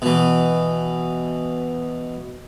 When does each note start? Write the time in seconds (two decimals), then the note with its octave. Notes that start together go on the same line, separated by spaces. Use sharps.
0.02 B2 E3